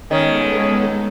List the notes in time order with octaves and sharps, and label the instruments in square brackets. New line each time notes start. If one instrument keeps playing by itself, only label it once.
[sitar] D#3 [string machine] G#3 B3 A4 [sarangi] C#4